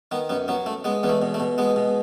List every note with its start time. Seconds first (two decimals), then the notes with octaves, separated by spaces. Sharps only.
0.11 D#3 B3
0.29 F#2 B3
0.48 F#3 B3
0.66 A3
0.84 G#3 B3
1.03 E2 B3
1.09 A3
1.22 B2
1.34 A3
1.40 B2
1.58 G#3 B3
1.76 B2